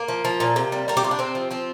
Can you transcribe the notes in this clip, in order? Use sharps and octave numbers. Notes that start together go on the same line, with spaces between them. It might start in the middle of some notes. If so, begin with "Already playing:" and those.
Already playing: A#3
F3
F3
A#2
C3
G3
G3 A#4
G4
C3 F4
D4
C3 C4
F3
F3 C4